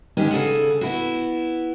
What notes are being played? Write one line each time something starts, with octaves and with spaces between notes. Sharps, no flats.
G#2 D#3 B3 C#4 G4
C#3 G#4 A4 F#5
B3 E4 F#4